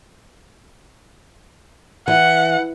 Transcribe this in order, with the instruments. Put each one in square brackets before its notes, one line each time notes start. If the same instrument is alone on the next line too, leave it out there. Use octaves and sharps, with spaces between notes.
[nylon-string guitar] E3 [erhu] F#5